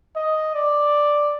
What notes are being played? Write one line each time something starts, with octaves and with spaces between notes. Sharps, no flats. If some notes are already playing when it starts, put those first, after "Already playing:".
D#5
D5